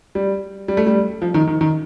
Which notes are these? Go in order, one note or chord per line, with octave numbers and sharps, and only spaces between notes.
G3
G3
A3
G3
F3
D#3
D#3
D#3